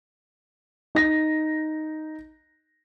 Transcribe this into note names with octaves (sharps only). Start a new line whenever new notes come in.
D#4 A#6